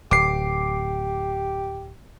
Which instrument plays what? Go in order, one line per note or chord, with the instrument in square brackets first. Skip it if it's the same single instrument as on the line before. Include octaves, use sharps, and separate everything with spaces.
[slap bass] D1 [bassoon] G4 [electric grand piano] D6 C7